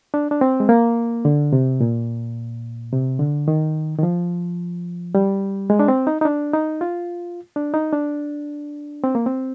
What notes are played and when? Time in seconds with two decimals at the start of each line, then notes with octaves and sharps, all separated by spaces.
0.14 D4
0.31 D4
0.41 C4
0.60 G#3
0.69 A#3
1.25 D3
1.53 C3
1.81 A#2
2.92 C3
3.19 D3
3.48 D#3
3.98 D#3
4.03 F3
5.15 G3
5.70 G#3
5.79 D4
5.88 C4
6.07 D#4
6.21 D#4
6.25 D4
6.53 D#4
6.81 F4
7.56 D4
7.74 D#4
7.93 D4
9.04 C4
9.15 A#3
9.26 C4